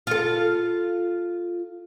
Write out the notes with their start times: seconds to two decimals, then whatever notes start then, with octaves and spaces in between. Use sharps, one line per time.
0.07 F4 A4